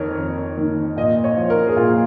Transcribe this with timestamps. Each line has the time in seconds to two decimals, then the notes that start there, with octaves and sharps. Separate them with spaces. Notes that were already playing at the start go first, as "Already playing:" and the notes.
Already playing: F2 D#3 A#4 C#5
0.18 F2
0.57 D#3
0.97 A#2 D#5
1.24 C#5
1.37 F3
1.50 A#4
1.67 G#4
1.77 A#2 F4